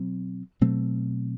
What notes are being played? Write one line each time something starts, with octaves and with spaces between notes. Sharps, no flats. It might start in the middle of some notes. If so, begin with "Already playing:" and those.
Already playing: B2 F#3 C4
B2 F#3 A3 C4